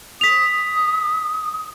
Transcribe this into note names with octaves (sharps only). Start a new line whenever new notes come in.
D#6 B6 F7